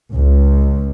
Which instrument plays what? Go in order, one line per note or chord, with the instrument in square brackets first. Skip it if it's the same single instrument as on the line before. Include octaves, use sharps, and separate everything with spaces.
[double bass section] C#2